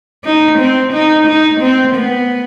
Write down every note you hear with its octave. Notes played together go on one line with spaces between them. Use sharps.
D#4
C4
D#4
D#4
C4
B3